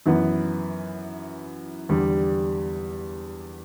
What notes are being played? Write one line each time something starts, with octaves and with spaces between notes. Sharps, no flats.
F#2 E3 B3
E2 D3 G3